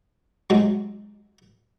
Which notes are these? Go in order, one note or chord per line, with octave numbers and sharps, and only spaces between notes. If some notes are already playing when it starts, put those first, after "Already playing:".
F#3 G#3 A3 C4 D#4